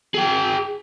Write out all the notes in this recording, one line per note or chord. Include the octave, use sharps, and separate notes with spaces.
G#4 G5